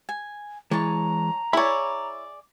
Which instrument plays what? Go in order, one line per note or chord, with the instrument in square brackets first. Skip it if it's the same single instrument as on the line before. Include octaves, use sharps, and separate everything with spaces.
[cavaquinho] G#5
[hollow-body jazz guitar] E3 G#3 [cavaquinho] C#5 A5 [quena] A#5
[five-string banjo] E4 C#5 [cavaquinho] G#4 D5 [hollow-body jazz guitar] B5